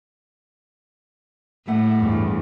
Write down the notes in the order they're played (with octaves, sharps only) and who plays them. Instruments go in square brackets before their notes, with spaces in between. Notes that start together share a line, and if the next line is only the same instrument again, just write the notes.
[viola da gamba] A2 [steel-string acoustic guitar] G3 A3 F#5
[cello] E2 G2